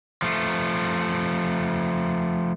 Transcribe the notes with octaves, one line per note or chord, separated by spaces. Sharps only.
F3 A3